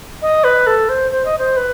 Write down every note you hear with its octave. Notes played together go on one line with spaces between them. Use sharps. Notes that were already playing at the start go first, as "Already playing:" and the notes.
D#5
B4
A4
C5
C5
D#5
C5
B4